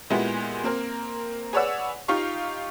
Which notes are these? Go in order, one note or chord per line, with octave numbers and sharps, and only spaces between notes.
A#2 G#3 B3 E4 G4
A#3 C4 A#4
G#4 B4 C#5 D5 F#5 E6
D#4 F4 G4 F5 C#6